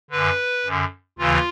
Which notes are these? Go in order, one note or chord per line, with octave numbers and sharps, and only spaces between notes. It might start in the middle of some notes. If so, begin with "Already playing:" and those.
F#2 D3 B4
F#2 D3
D#2 C#3 E3 F4